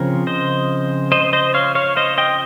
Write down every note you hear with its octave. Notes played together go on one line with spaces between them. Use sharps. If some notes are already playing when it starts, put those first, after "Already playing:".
Already playing: C#3 F3 C4 A#4 C#5
C5 D#5
C5 D#5
C5 D#5
C#5 F5
C#5 F5
C5 D#5
D#5 G5